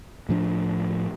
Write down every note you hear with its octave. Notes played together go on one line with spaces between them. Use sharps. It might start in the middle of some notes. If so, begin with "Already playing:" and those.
A2 F3 D4